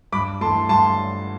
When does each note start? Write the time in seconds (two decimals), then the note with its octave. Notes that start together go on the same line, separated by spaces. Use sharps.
0.12 G2 B5 D6
0.41 A3 A5 C6
0.46 E3
0.69 G2 A5 C6